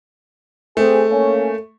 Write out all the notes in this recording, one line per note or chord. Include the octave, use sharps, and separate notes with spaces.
A3 C4 G#4
A#3 C#4